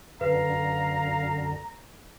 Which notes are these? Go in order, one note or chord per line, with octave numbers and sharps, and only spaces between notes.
F#2 D3 B4 F5 A#5